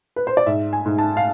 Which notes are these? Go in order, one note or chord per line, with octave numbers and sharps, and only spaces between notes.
B4
C5
D5
G#2 E5
G#5
G#2
A5
F5